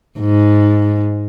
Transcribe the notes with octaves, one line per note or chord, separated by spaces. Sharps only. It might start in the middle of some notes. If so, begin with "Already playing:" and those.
G#2